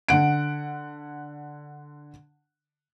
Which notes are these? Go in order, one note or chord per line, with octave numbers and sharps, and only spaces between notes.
D3 F#5 D7